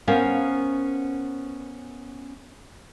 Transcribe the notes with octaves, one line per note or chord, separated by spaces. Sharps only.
B3 C#4 A#4 C5 F5